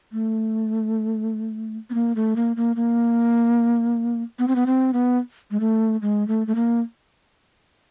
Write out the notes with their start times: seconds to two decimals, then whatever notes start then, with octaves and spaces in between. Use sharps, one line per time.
0.12 A3
1.90 B3
1.94 A#3
2.16 A3
2.36 A#3
2.56 A#3
2.76 A#3
4.39 B3
4.48 C4
4.56 B3
4.66 C4
4.93 B3
5.51 G#3
5.60 A3
6.02 G#3
6.28 A3
6.47 A3
6.55 A#3